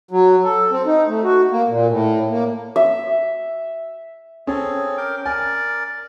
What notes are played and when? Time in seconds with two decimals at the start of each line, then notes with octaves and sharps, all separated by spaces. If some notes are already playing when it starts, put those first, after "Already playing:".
0.11 F#3
0.44 A4
0.71 C4
0.86 D#4
1.08 A3
1.24 F#4
1.51 A#3
1.69 A#2
1.89 A2
2.30 A#3
2.76 E5
4.47 C4 C#4 G#4 A4
4.97 A#4 G5 D6
5.26 A#4 D5 G#5